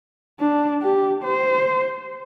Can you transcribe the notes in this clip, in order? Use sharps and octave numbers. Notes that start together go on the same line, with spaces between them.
D4
G4
C5